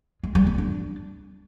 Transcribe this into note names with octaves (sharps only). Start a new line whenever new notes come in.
G#3
G3
B3
D4